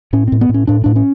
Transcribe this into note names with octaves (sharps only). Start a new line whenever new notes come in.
A2 C#4
A2 C4
B3
A2
C#4
A2 D4
A2 D4
C#4